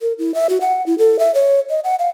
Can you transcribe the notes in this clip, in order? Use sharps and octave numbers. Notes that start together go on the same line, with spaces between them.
A#4
E4
E5
F#4
F#5
E4
A4
E5
C#5
D#5
F#5
F5